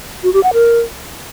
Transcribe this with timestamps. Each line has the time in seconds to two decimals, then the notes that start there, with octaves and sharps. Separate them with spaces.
0.23 F#4
0.33 G4
0.43 F#5
0.53 A#4